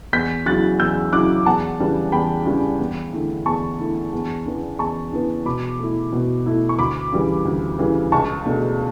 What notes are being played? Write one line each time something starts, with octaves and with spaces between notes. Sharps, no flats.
E2 G6 B6
C#3 F#3 C#4 E4 F#6 A6
E2 E6 G6
C#3 F#3 C#4 E4 D6 F#6
E2 F#5 A5
C#3 E3 G3 D4
E2 G5 B5
C#3 E3 G3 D4
E2
D3 A3 E4
E2 A5 C#6
D3 A3 E4
E2
C#3 E3 B3 D4
E2 A5 C#6
C#3 E3 B3 D4
B2 B5 D6
A3 E4
B2
A3 E4
C#6
D2 B5 D6
C#3 E3 G3
D2
C#3 E3 G3
C#2 A5 C#6
B2 A3 D4